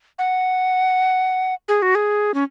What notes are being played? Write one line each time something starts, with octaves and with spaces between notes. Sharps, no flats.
F#5
G#4
F#4
G#4
C#4